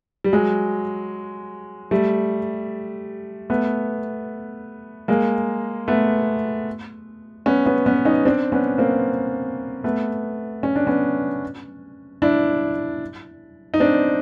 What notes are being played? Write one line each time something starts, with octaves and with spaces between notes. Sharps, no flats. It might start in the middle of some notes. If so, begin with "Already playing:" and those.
G3
F#3 G#3
G3 A3
A3 B3
G#3 A#3
A3 B3
B3 C#4
B3 C#4
B3 C#4
C#4 D#4
C4 D4
B3 C#4
A#3 C4
A3 B3
C#4
D4
B3 C#4
D4 E4
D#4
C4 D4